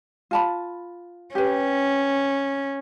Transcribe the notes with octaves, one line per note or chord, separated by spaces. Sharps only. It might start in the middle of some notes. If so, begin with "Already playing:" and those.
F4 A5 B5
C#4 G4 B4